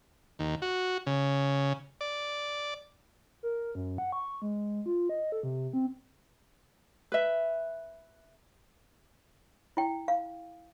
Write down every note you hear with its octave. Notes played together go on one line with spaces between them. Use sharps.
D#2
F#4
C#3
D5
A#4
F#2
F#5
C#6
G#3
F4
D#5
A4
C3
C4
B4 E5
E4 G5
F5